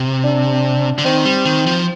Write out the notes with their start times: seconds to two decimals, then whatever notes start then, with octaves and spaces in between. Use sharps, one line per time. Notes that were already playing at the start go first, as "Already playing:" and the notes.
Already playing: C3
0.24 D4
0.98 D3
1.05 D#3 C4
1.25 G3
1.45 D#3
1.66 F3